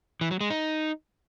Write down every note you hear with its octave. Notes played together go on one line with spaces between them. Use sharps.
E3
F#3
G#3
D#4